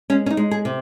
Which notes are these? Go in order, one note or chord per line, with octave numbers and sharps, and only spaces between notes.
G#3 C#4
C#4
D#4
G#3
G#4
C3